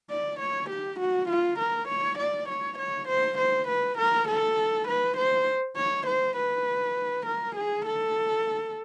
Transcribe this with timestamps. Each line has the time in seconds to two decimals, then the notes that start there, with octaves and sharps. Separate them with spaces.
0.10 D5
0.40 C#5
0.70 G4
1.00 F#4
1.29 F4
1.59 A#4
1.88 C#5
2.18 D5
2.49 C#5
2.79 C#5
3.08 C5
3.38 C5
3.68 B4
3.98 A#4
4.28 A4
4.88 B4
5.17 C5
5.76 C#5
6.06 C5
6.37 B4
7.26 A#4
7.56 G#4
7.86 A4